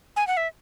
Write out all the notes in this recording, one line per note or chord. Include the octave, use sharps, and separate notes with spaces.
G#5
F#5
E5